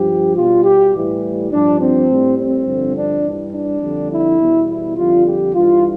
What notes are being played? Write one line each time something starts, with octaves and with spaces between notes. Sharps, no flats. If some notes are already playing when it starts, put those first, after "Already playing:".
Already playing: G2 F3 G4
B2 G3 F4
G4
A2 E3 G3
G2 F3 D4
C4
A2 G3
C4
G2 D3 F3
D4
G2 E3 G3
D4
F2 D3 G3
E4
E2 B2 G3
E4
F2 D3 G3 F4
G4
G2 E3 G3 F4